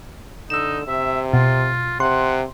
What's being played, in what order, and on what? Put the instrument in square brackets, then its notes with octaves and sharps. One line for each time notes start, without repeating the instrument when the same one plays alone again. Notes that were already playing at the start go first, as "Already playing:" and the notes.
[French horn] D3 [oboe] D#4 [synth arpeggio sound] E6 E7
[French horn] C3 [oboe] E5
[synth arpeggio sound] B2 [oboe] F4
[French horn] C3 [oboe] F#5 [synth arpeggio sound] C6